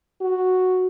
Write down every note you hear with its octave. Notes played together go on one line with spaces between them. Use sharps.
F#4